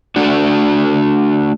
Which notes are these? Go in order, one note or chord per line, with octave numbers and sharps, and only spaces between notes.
A3 D4 F#4